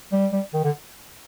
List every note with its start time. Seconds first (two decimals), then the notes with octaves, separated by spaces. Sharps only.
0.12 G3
0.33 G3
0.54 D#3
0.65 D3